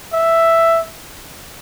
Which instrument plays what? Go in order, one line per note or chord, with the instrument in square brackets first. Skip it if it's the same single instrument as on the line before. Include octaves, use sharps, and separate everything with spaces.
[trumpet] E5